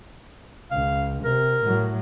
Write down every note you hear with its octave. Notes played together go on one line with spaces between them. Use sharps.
C#2 F5
C3 A#4
A2 F#3